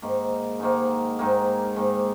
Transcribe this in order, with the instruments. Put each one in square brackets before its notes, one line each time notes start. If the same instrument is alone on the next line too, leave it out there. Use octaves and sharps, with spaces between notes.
[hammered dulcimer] G#2 D#3 A#3
G#2 D#3 A#3
G#2 D#3 A#3
G#2 D#3 A#3